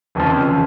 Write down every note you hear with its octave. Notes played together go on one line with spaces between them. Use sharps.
F1 F2 C#3 F3
C#3 F3